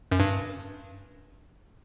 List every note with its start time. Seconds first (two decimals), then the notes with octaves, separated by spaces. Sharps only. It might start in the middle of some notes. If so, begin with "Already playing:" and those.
0.12 F#2
0.20 G2